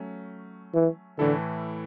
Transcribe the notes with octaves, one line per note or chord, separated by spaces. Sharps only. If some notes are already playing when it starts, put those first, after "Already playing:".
Already playing: F#3 A3 C#4
E3
A2 D3 E3 A3 E4 A4